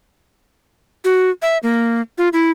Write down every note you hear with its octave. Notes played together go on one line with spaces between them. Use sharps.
F#4
E5
A#3
F4
E4